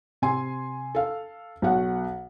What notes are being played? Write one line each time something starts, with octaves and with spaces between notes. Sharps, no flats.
C3 G#5 C6
A4 F5
B1 F#4 F#5